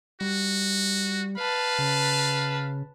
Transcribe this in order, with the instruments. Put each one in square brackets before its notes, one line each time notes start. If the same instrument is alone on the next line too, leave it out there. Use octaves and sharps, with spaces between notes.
[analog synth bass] G3 [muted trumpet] F#4
[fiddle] B4 A5 [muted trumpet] F5
[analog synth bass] C#3